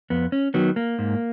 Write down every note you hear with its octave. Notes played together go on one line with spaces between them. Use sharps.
F2 B3
C#4
D#3 F#3 B3
A#3
G#2